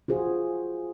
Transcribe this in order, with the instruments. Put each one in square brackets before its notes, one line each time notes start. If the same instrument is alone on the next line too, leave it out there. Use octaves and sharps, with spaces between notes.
[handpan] F4 F#4 G#4 C5